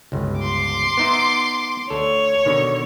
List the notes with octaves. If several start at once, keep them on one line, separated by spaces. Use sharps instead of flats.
G1 C#2
C6 D6
B3 D#4 E5
D2 A4 C#5
B2 D3 D#3